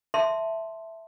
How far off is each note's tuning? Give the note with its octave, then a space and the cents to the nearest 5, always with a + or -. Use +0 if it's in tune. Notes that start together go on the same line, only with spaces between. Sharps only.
E5 +0 A5 +0 C6 +0